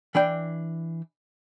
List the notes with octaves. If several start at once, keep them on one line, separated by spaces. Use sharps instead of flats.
E3 D4 G5